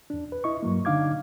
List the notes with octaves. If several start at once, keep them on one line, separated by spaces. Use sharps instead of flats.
E2 D4
B4
E4 D#5 C#6
G2 F#3 A#3
D3 D4 D#4 F5 D6 G#6